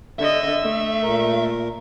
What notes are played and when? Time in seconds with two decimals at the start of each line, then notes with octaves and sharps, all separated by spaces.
0.19 D3 D#5 E5
0.63 A3
1.03 A#2 A#4